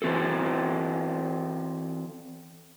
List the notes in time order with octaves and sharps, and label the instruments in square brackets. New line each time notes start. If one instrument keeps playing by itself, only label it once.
[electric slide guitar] E3 C4 F#4 A4